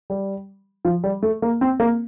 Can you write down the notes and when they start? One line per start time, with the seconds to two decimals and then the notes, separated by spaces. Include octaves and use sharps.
0.10 G3
0.85 F3
1.04 G3
1.23 A3
1.42 A#3
1.61 C4
1.80 A#3